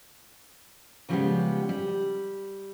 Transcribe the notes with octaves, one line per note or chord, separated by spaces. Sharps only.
C#3 F3 G3 G#3 B3 G4
G3